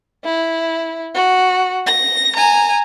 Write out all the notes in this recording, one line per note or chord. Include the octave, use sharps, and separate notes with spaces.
E4
F#4
A#6
G#5 A#5